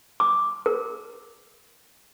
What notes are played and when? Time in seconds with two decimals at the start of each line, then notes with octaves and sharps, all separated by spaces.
0.20 D6
0.66 A#4